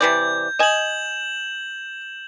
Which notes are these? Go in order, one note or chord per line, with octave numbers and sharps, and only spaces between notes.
C3 E3 D5 G6
D#5 G#5 E7 F#7